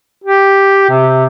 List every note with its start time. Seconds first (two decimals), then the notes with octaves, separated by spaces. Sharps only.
0.24 G4
0.90 C3